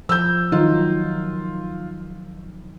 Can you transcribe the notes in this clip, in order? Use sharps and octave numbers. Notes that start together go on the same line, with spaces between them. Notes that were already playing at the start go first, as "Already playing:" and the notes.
F3 E6 G6
D#3 F#3 D#4 F4